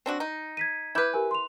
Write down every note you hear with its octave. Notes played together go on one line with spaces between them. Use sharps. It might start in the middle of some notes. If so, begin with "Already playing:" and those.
C4 D4 F#4
D#4
G#6 B6 D#7
E4 B4 D6 G6 G#6
G4 A#4 G#5
C6 F7